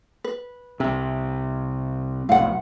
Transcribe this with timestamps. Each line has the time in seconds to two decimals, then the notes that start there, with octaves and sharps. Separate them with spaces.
0.24 B4
0.80 C2 C3
2.29 F1 B1 A2 F5 F#5